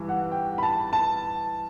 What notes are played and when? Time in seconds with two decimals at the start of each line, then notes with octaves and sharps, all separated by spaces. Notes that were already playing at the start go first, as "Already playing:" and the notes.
Already playing: G2 E3
0.09 F#5
0.31 G5
0.58 B5
0.63 A5
0.93 A5